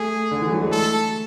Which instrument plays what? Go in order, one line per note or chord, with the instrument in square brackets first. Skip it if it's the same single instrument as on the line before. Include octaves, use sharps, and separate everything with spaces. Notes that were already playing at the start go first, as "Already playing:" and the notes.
Already playing: [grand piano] A3 [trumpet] G#4
[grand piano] D3
E3
F#3
G#3
[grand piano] A3 [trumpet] A4